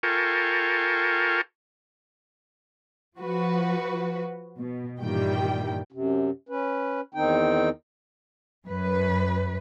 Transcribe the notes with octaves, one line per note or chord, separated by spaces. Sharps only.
F4 A4 A#4 G5 G#5 C#6
F3 F#4 B4
B2
G2 A#2 D#3 E3 G3 G5
F#2 C3
C#4 B4
E2 D#3 C4 D#4 G5
F#2 B4